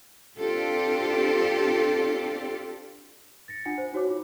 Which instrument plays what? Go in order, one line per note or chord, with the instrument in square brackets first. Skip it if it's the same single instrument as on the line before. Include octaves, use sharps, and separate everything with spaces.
[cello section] C4 D4 F4 G4 A4
[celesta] A6 A#6 C#7
D4 F4 F#5 G#5 C#7
C5
D#4 F#4 C#5 D6
F4